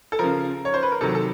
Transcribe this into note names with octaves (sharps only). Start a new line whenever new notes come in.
A4
C#3 F3 A#4
C#5
C5
B4
A#4
C3 D#3 F#3 A4
A4